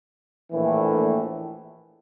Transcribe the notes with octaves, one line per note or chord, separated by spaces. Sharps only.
A#1 A2 E3